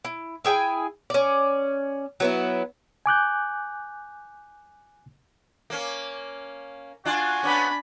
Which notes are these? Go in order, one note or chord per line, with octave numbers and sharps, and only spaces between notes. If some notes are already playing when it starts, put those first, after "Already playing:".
E4
E4 G#4 G5 G#5
C#4 D5
F#3 B3 E4
G#5 D6 F#6 G6
A#3 C#4
D4 F4 F#4 G#5
B3 C#4 D4 B5